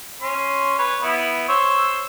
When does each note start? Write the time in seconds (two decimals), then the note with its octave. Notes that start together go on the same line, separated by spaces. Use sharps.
0.21 C#4 C6
0.79 B4 C#5
1.02 B3 E4
1.48 C5 C#5 E6